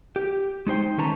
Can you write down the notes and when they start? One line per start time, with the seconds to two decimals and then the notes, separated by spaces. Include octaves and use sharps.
0.16 G4
0.67 G#3 D#4 C5 G5
0.98 D#3 A3 C#4 B4 A5 A#5